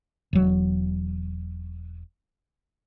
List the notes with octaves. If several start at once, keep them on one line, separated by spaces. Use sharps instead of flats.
E1 F#3